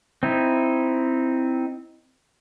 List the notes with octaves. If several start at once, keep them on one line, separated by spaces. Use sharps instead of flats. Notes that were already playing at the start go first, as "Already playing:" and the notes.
C4 D#4 E4